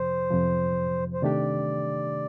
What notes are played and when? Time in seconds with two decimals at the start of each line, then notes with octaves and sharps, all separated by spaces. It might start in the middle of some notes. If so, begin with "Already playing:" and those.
Already playing: F2 C3 F3 C5
0.31 F2 C3 F3
1.14 C5
1.22 C3 D#3 A3 D4 G4 D5